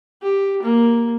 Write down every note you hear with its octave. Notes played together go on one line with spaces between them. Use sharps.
G4
A#3